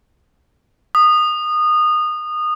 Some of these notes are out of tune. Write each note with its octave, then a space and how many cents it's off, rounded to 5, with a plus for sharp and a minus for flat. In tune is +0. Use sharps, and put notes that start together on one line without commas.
D#6 -20